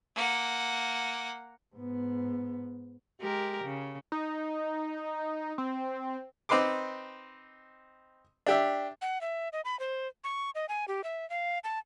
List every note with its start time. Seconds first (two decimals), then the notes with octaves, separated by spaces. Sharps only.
0.16 A#3 F#5
1.75 G#2 B3
3.21 G#3 G4 A#4
3.64 C#3
4.12 D#4
5.58 C4
6.49 C4 D#4 B4 C6 D6
8.46 D4 G4 E5
9.02 F#5
9.21 E5
9.53 D#5
9.65 B5
9.80 C5
10.24 C#6
10.55 D#5
10.69 G#5
10.88 G4
11.04 E5
11.30 F5
11.64 A5